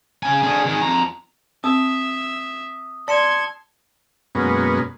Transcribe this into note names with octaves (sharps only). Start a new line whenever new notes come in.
C#3 G#5
D3 G#4
D#3 G#4
F2 A#5
C4 E5 D#6 E6
D5 A5 C6 G#6 C#7 E7
F#2 B2 G#3 A#3 B3 C#4